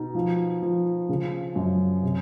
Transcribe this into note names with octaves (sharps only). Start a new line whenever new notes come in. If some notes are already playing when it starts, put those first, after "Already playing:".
Already playing: B2 D#4
F3
F3
C#3
F#2
C3